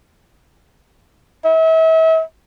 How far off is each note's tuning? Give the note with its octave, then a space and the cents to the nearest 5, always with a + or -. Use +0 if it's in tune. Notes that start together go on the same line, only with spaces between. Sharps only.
E5 -40